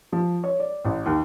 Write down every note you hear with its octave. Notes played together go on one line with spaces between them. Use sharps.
F3
C#5
D5
A1
D#2